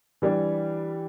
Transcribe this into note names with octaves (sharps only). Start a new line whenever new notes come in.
E3 G3 D4